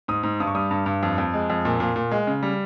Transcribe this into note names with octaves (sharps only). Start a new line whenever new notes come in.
G#2 D#6
G#2
G2 D#6
C#6
G3 D#6
G2
G2
F2
F2
G#3
F2
A#2
A#2
A#2
G#3
C#3
G3